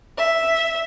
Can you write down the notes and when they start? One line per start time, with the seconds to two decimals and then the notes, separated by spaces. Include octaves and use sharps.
0.17 E5